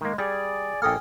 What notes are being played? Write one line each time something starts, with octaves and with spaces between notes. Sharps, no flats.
D#3 G#3 A#3
G3 G#4 D5
A#1 A#3 A4 G5 D#6 F6